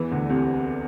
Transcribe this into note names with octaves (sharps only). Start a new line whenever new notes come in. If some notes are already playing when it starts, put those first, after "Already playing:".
Already playing: E2 E3
D2 D3
C2 C3